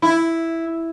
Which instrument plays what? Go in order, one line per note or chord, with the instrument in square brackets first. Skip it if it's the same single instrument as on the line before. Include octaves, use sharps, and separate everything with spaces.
[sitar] E4